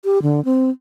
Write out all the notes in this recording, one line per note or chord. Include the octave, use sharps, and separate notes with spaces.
G4
D3
C4